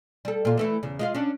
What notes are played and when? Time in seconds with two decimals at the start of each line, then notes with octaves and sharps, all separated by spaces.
0.25 G3 A4
0.45 A#2 F4
0.57 E3 A3 E4
0.83 E2 C#3
0.99 G#3 F4 F5
1.14 C#4 D4